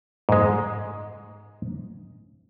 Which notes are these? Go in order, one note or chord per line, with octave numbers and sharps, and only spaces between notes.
G#2 G#3